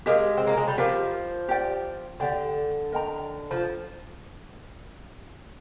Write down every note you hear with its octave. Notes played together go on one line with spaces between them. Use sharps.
G#3 G4 A#4 F5
C4
A#3
G#3
G3
F3 G4 A#4 F5
G4 D5 G5
D3 G4 D5 G5
A#4 D#5 G5 A#5
F3